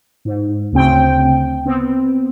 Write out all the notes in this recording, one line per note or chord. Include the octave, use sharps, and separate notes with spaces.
G#2
D2 C#3 C4 G5
B3 C4